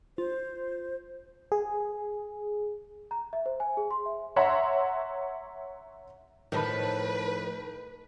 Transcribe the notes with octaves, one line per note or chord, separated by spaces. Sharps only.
F4 C5
G#4
A#5
E5
C5
G#5
G#4
C6
E5
C#5 E5 F#5 A#5 C6
A2 D#3 F3 D#4 B4 A5 B5